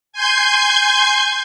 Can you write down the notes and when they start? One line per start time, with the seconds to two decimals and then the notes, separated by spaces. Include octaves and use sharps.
0.13 G#5 C6 G6 G#6